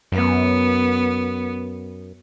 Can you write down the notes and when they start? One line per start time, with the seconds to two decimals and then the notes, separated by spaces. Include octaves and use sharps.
0.12 F#2 B3